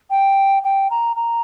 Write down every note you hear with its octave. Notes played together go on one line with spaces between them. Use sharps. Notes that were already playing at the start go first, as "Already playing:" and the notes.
G5
G5
A#5
A#5